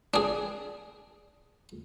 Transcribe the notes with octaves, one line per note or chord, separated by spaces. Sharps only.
D4 G#4